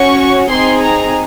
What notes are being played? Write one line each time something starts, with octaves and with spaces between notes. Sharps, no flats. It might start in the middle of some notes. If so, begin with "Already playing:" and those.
Already playing: C#4 F#4 C#6
C4 D#4 G#4 C6
A#5